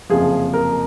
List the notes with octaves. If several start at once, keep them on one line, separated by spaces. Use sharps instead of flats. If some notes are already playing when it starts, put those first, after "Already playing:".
F#1 F2 C3 F3 G#4
A#4